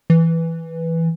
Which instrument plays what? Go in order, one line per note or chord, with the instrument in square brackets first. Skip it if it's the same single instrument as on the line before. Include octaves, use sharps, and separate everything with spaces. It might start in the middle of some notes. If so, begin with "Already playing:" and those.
[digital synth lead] E3